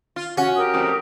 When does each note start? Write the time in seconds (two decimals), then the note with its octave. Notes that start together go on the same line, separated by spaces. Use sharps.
0.16 F4
0.37 C#4 F#4
0.56 G4 A#4 D#6
0.74 F2 A2